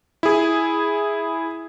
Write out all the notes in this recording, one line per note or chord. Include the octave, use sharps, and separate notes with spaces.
E4 G#4